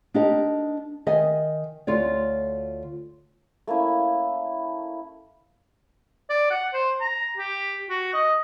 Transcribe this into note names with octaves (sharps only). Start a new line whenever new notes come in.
D4 D#4 G4 A#4 D#5
D#3 D#5 E5 G#5
D2 F4 C#5 D5
A3 A#3 C#4 E4
D5
F#5
C5
A#5
G4
F#4
D#5